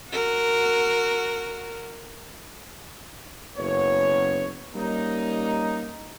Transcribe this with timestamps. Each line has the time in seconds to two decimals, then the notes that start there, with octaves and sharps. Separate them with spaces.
0.11 F#4 A#4
3.58 F#1 F#2 B3 C#5
4.75 G3 A#3 C#4 D#4